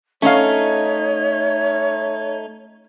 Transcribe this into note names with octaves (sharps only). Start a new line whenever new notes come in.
A3 C#4 D#4 A4 C#5 F5